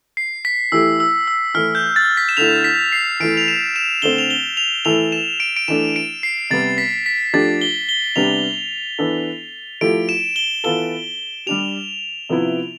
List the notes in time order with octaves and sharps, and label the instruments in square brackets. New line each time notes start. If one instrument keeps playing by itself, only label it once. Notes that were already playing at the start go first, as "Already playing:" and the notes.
[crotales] C7
B6
[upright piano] E3 A3 E4 G4 [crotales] E6
[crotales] E6
E6
[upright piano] E3 A3 E4 [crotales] F6
[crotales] G6
A6
B6
E7
[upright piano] D3 A3 E4 [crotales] F7
[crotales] B6
C7
[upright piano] E3 A3 E4 [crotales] D7
[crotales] F7
E7
E7
[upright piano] D3 A3 C4 [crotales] G7
[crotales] F7
G7
F7
[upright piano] E3 A3 E4 A4 [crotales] F7
[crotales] E7
D7
D7
[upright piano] E3 A3 D4 [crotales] E7
[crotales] D7
C7
[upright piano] C3 G3 B3 [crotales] A6
[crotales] B6
B6
[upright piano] F3 A3 D4 G4 [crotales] A6
[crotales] G7
G7
[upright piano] C3 G3 B3 D4 G4 [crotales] F7
[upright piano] E3 B3 D4 A4
[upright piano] F3 A3 E4 G4 [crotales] D7
[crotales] E7
G7
[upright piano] E3 B3 F4 A4 [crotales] G7
[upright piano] G3 D4 G4 [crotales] F7
[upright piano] C3 F3 B3 E4